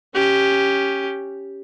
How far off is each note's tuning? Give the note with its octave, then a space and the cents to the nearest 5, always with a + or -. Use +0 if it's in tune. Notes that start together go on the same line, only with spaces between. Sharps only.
C#4 +0 G4 +0